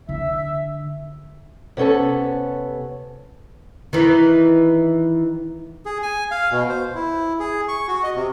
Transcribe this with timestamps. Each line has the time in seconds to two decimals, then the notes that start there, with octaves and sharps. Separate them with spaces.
0.09 D3 E5
1.77 C3 B3 C#4 A4 A5
3.93 D#3 E3
5.86 G#4
6.03 G#5
6.31 F5
6.51 B2
6.69 C5
6.95 E4
7.40 G#4
7.68 C#6
7.88 F#4
8.03 D#5
8.15 C3